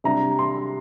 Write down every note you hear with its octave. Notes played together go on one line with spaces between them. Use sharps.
C3 G3 D4 A#5
C6